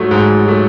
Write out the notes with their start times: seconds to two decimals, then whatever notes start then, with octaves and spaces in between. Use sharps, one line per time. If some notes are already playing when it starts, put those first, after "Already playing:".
Already playing: G#2 F#3 A3
0.11 G#2
0.46 F#3 A3